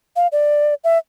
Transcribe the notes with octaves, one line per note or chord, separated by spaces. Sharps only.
F5
D5
E5